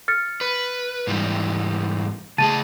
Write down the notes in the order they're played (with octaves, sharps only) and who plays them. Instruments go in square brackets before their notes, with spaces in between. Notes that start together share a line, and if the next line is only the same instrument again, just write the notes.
[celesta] F6 A6 C#7
[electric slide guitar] B4
G#2 E3 G3
[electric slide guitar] C#3 A3 G#4 [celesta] A5 A6 D#7